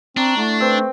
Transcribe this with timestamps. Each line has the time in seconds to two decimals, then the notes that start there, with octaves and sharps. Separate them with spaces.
0.17 C4 D4 A#5 C#6
0.37 A3 E4 F#5 C#6
0.60 C4 B4